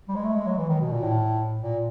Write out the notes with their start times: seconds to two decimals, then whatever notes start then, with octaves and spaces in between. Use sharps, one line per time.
0.08 G3
0.15 G#3
0.24 A3
0.35 G#3
0.46 F#3
0.58 E3
0.69 D#3
0.81 B2
0.92 A#2
1.03 A2
1.61 A#2